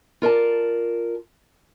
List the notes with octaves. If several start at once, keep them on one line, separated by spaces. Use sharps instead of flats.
F4 A#4 D5 A5